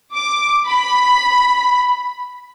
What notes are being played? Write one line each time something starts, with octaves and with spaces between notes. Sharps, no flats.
D6
B5